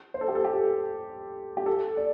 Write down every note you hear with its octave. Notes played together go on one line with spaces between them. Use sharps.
C5
A4
G4
A4
G4
G4
A4
D5